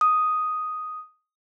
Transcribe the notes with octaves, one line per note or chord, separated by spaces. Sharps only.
D#6